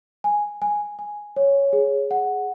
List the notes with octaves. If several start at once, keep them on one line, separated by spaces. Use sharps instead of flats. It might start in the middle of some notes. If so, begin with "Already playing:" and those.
G#5
G#5
G#5
C#5
G#4
F#5